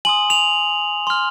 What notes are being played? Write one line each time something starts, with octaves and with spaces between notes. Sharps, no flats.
G#5 C6 D#6 F#7
F7
C6 F6